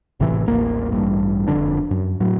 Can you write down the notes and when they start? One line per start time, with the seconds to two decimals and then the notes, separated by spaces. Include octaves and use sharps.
0.20 G#1 A2 C3 E3
0.46 D#1 A1 A#3
0.92 A1 G2
1.48 F1 F2 D3 D4
1.91 F#2
2.20 A2 F#3